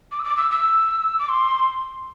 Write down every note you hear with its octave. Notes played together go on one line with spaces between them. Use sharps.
D6
E6
D6
E6
E6
D6
C6